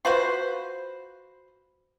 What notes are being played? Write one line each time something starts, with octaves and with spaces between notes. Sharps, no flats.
F4 F#4 B4 C5